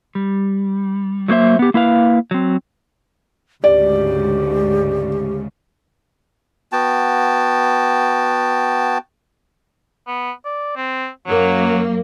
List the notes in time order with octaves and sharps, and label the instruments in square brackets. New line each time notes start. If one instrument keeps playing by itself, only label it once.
[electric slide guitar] G3
F#3 A3 A#3 C5 E5
B3 G4
A#3 E4 B4 F5
F#3 C4
[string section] D2 G#2 C#3 [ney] G4 [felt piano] D5
[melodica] B3 F#4 G5 A5
[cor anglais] B3
D5
C4
[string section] F#2 A#3 [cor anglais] F#3